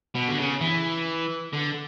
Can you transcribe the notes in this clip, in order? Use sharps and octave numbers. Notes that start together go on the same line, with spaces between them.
B2
D3
C#3
E3
D3